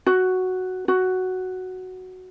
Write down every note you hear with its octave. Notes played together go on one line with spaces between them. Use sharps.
F#4
F#4